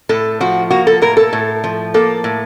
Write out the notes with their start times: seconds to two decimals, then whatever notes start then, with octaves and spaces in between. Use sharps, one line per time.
0.09 A2 A4
0.41 F3 F#4
0.70 A#3 F#4
0.87 A4
1.02 A2 A#4
1.17 A4
1.33 A2
1.64 F3
1.94 A#3 A4
2.24 A2